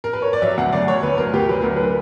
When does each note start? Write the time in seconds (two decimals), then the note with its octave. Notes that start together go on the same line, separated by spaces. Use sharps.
0.04 A#4
0.13 B4
0.22 C#5
0.33 D5
0.42 F#3 E5
0.57 D2 F#5
0.73 D2 D5
0.88 F#3 C#5
1.03 D2 B4
1.18 D2 A#4
1.33 D2 G4
1.48 F#3 B4
1.62 D2 A#4
1.76 D3 B4